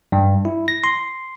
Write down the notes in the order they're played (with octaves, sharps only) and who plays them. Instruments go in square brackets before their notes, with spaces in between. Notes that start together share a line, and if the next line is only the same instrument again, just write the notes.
[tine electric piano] G2
E4
A#6
C6